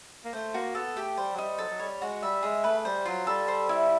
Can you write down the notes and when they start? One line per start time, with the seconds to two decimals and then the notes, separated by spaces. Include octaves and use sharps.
0.24 A#3
0.33 A3 C5
0.54 A#3 F#4
0.75 B3 A4
0.96 A3 G4
1.17 G3 C5
1.34 F#3
1.38 G3 D#4
1.58 F#3 A4
1.70 F#3
1.79 G3 C#5
2.01 G#3 F#4
2.23 G3 E5
2.43 G#3 G#4
2.64 A3 B4
2.85 G3 C5
3.06 F#3 F4
3.27 G3 A4
3.48 C5
3.69 E4